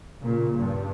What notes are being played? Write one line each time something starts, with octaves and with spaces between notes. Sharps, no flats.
A#2 C#3
G2